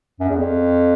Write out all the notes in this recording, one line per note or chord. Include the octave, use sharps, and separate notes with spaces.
F#2
E2
F2